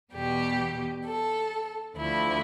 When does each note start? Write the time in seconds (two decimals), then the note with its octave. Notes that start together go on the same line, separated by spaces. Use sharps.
0.13 E2 B2 G3 G4
1.04 A4
1.97 D2 D3 F3 E4